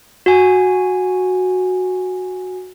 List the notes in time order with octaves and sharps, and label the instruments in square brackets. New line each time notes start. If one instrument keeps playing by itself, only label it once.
[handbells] F#4 G#5